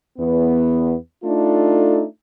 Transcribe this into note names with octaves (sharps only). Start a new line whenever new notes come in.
E2 B3
A3 D4 D#4 F4 A4